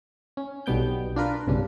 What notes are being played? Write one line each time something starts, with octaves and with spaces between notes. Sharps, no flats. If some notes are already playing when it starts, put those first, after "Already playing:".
C#4
B1 B2 G3 B3 G5 G6
D4 F4 A#4 B4
B1 G2 C#3 D4